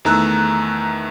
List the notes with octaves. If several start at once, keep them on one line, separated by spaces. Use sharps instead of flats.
E2 D#3 A3 A#5 E6 F#6